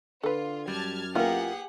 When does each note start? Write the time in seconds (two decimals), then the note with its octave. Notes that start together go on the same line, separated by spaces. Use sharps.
0.23 D3 F4 A4 B4
0.68 F#2 G3 A5 F6 G#6
1.15 A#3 B3 E4 F4 G4 G#4 A#4 F#5